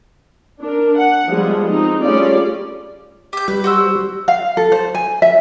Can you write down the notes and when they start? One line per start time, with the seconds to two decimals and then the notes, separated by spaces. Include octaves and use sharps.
0.62 D4 A#4
0.97 F#5
1.29 F3 G3 G#3 B3
1.67 G#3 C4 D#4
2.02 G3 A3 C#4 F4 G#4 D5
3.33 G4 G6
3.48 G3 B4
3.64 F#4 C5 E6
4.28 F5
4.57 A4
4.72 C5
4.95 G#5
5.22 E5